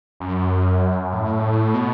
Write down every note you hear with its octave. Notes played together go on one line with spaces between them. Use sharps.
F#2
A2
B2